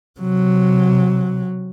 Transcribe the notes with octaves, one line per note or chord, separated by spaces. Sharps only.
C3 F#3